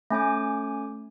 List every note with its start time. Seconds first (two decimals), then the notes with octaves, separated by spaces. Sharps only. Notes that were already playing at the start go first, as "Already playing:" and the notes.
0.10 A3 C#4 G#5 D6